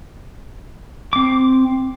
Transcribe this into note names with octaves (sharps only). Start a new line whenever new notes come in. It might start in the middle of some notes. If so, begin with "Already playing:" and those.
C4 D6